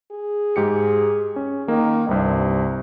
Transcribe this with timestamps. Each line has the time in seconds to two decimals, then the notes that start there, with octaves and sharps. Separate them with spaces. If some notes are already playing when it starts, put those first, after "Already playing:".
0.11 G#4
0.56 G#2 G4 C#7
1.36 C#4
1.68 D#3 A#3
2.09 C2 G2 C3